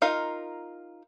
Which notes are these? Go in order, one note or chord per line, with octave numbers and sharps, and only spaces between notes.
D#4 F4 A#4 F5